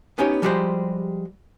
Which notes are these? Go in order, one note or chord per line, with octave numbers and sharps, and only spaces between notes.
B3 C#4 D#4 G4 C#5
F3 G3 G#3 F#4 G4 C5